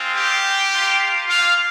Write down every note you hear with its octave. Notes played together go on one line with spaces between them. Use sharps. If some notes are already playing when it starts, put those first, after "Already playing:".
Already playing: G#3 C4 F4
G4 G5
A#3 F4
F4 F5